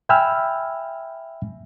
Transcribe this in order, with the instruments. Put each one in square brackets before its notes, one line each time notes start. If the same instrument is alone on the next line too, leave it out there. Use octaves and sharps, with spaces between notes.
[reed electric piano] E5 G5 G#5 B5 E6 F6